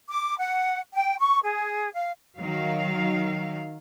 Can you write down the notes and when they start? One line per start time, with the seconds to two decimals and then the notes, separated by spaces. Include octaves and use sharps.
0.09 D6
0.38 F#5
0.93 G5
1.18 C#6
1.43 G#4
1.95 F5
2.38 D#3 F#3 F5